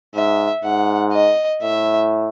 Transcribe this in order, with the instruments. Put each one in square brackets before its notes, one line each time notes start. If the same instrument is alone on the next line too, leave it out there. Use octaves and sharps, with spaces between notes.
[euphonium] G#2 [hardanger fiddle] E5
[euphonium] G#2 [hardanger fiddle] F#5
[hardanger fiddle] D#5
[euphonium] A2 [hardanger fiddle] E5